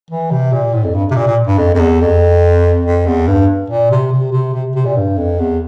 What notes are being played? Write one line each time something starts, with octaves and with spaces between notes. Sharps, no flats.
E3
C3
A#2
A2
F2
G2
C3
A#2
A#2
G2
F2
F2
E2
F2
F2
E2
G2
A#2
C3
C3
C3
C3
C3
A#2
G2
F2
E2